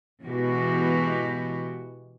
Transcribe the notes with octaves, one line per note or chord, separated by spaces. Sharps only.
B2 E3 G#3 B3 F#4 G4